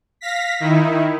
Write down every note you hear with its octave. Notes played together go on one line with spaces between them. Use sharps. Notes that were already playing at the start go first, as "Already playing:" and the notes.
F5 A#6 B6
D#3 D#4 E4